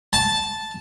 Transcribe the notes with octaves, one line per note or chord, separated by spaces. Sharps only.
A5